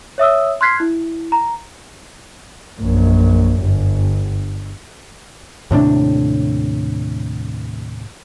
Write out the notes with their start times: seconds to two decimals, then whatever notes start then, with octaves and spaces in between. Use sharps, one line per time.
0.18 C#5 E5 D#6 E6
0.61 C6 F6 F#6 G#6 B6 C7
0.80 E4
1.32 A#5
2.79 A#1 F#2
3.61 G1
5.71 D#2 A2 C3 D4